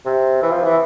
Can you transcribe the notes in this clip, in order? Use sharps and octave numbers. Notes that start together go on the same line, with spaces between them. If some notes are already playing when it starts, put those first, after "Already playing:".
C3
E3
F3
E3